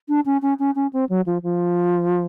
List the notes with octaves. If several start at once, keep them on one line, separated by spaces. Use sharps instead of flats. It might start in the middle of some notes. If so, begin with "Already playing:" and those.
D4
C#4
C#4
C#4
C#4
C4
F#3
F3
F3